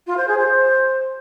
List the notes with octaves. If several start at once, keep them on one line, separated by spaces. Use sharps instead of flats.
F4
C5
G#4
C5